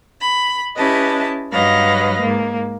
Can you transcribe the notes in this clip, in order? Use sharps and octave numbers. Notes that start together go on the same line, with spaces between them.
B5
C#4 E4 G4 B4 D#5 A5
G2 F#3 B4 D#5 F5 A#6
G#2 A#3